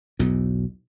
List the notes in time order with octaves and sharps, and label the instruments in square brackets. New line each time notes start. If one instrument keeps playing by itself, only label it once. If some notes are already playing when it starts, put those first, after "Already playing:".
[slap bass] B1 E2